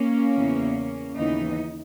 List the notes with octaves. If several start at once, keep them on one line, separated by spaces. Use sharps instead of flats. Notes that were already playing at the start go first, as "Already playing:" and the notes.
Already playing: A#3 C#4
E2 C#3 E3
D#2 C#3 E3 B3 D#4